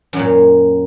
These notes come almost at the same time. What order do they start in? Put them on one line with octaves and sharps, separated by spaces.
F#2 F#3 A#2